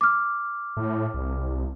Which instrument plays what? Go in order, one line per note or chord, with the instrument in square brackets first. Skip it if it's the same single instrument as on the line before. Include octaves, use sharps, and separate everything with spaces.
[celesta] D6 F6
[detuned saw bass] A2
C2